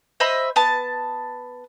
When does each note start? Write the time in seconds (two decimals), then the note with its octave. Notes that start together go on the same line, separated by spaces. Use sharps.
0.20 C5 D#5 E5 B5
0.56 B3 A5